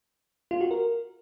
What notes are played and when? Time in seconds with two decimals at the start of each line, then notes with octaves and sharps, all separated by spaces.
0.51 F4
0.61 F#4
0.71 A#4